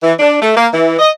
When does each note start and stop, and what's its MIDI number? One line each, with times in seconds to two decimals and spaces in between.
0.03 0.13 52
0.19 0.36 62
0.42 0.53 57
0.57 0.68 58
0.73 0.96 52
0.99 1.11 75